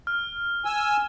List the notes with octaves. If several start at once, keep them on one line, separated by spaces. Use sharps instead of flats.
F6
G#5 E6